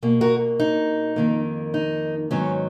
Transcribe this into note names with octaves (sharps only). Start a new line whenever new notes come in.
B2 A#3
F#4 A#4
D#4
F2 D#3 A#3
D#4
G#2 D#3 F#3 B3 C#4